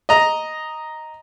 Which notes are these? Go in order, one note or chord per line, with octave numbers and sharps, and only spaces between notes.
D#5 A#5